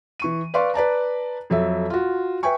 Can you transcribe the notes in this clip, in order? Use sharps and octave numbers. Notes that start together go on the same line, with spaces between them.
E3 C#6 D#7
B4 D5 F5 C6 C#6
B4 D5 A5 A#5
F2 F#3 A4 E5
F4 F#4
B4 E5 G5 G#5 C#6